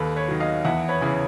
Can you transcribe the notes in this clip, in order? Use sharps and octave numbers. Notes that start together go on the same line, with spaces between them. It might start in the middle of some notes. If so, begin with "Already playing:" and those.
Already playing: D#2 A4 B4
B4 C#5
D#3 F#3
D#5 F5
E2 E5 F#5
B4 C#5
C#3 E3